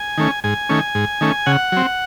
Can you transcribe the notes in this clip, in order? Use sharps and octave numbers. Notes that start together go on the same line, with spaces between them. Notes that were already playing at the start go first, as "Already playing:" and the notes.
Already playing: G#5
D#3 A3 C#4
G#2 G#5
D#3 A3 C#4
G#2
D#3 A3 C#4
C#3 F#5
F#3 C4